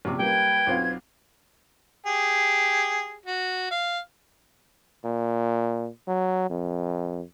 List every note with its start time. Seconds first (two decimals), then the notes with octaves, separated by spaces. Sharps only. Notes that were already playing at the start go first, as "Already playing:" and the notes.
0.05 A#1 C3 D6
0.19 G3 A#3 B4 G5 G#6
0.67 B1 C4 F4
2.06 G4 G#4
3.26 F#4
3.71 F5
5.04 A#2
6.08 F#3
6.50 F2